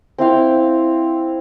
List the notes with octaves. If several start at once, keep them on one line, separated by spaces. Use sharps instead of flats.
C4 E4 F5 G5